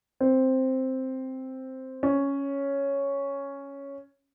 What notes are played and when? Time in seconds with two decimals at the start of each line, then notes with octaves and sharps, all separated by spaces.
0.21 C4
2.03 C#4